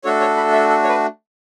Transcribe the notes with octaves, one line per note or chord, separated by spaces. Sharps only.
A3 D4 F#4 A4 C#5
C#5
B5
E5
A4
C#5
B4